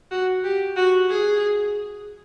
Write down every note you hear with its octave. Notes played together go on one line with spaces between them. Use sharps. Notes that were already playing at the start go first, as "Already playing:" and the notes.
F#4
G4
F#4
G#4